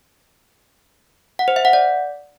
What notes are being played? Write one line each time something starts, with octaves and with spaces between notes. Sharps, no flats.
F#5
C5
E5
F#5
D5